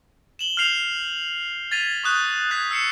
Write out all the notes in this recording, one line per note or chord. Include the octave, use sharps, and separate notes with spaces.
E7 F#7 G7
F6 G6 C7 F7
G#6 A6 B6 D#7 F7
C#6 D#6 F#6 G6
F#6 G#6 B6
E6 C7 C#7 E7